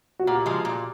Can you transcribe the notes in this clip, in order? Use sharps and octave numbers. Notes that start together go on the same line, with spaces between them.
F#4
A#2 G4
F3 G#3
A#2